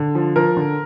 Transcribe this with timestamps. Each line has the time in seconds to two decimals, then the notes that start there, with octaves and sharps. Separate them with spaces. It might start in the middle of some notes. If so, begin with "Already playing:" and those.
Already playing: D3
0.15 F3
0.36 F3 A#4
0.57 D3